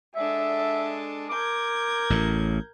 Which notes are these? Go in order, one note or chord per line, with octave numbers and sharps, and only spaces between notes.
G#3 D4 A4 E5
A#4 D6 G6 G#6
A1 A2